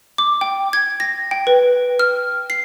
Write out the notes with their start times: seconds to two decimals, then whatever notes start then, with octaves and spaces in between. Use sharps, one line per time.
0.18 D6
0.41 G5
0.73 G#6
1.00 A#6
1.31 G5
1.47 B4
1.99 F6
2.50 C7